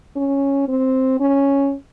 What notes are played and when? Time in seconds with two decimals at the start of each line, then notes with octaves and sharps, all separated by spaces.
0.16 C#4
0.68 C4
1.20 C#4